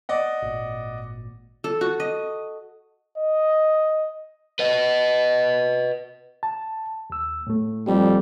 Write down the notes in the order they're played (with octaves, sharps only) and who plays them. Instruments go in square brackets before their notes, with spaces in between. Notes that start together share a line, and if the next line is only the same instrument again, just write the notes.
[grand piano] D5 D#5 F#5
[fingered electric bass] G#1 A#2
[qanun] A4
F#4
D#5
[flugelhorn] D#5
[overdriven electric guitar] B4 D#5
[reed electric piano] A5
D#2 E6
A2 A3
[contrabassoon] F2 [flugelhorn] G3